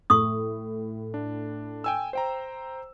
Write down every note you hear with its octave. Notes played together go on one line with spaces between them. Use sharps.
A2 C#6 D#6
D4
G5 G#5 E6
C5 G5 A#5